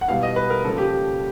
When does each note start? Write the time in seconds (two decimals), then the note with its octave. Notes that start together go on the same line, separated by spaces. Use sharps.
0.01 F#5
0.08 B2 G3 B3 E4 F5
0.23 D#5
0.36 B4
0.50 A#4
0.64 C#3 F3 A#3 A4
0.78 G4